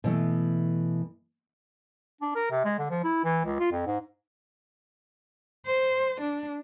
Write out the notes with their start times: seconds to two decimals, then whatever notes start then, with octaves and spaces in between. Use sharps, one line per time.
0.04 B2 E3 A3
2.21 D4
2.35 A#4
2.51 C3
2.65 G#3
2.79 D3
2.90 F3
3.04 E4
3.24 E3
3.45 C#2
3.59 F4
3.72 F2
3.87 G#2
5.66 C5
6.21 D4